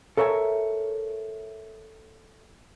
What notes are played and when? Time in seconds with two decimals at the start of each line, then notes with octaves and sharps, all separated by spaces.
0.17 A4 A#4 C#5 E5 F#5 G#5